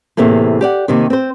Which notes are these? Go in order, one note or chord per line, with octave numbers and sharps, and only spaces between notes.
E2 A2 C3 A3 A#3
G4 D5 F#5
D#2 C3 D#3
C4 C5